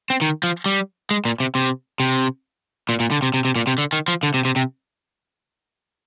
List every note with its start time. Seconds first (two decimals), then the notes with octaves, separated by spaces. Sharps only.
0.10 C4
0.21 D#3
0.43 F3
0.66 G3
1.11 G#3
1.25 A#2
1.40 C3
1.55 C3
2.00 C3
2.89 A#2
3.00 A#2
3.11 D3
3.22 C3
3.34 C3
3.45 C3
3.56 A#2
3.67 C3
3.78 D3
3.93 D#3
4.08 F3
4.23 D3
4.34 C3
4.45 C3
4.56 C3